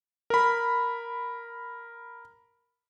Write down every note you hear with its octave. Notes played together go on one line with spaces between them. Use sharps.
A#4 B5